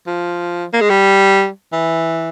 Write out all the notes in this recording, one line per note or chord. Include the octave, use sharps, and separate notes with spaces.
F3
A#3
G#3
G3
E3